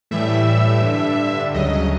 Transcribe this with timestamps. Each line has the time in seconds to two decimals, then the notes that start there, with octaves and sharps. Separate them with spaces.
0.11 A2 E3 G3 E5
0.82 G2 D3 G3
1.54 D2 C#3 F#3 D#5